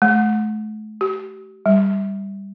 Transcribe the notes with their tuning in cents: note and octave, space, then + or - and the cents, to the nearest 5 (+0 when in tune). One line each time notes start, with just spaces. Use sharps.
A3 -40
G4 -35
G3 +5